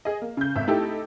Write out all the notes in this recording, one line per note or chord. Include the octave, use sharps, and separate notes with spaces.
G#4 D#5
A#3
C#3 G6
G#1 E5
A3 D#4 E4 G4 A4